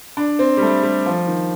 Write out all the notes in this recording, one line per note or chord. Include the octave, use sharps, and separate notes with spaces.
D4
C4
G3
A3
G3
F3
D#3